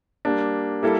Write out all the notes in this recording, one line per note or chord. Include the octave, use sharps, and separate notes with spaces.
G3 A#3 D4
G3 A#3 E4 A4